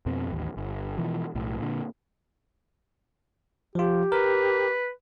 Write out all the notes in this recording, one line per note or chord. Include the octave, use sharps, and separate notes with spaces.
F2 B2 C4
A1 D#2
G1
B2 E3 F3
B1 A2
A#2 D3
F3 F4 G4
A#4 B4